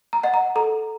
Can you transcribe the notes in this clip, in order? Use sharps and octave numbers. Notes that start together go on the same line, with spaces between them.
A#5
D#5 F#5
A#5
A4 A#5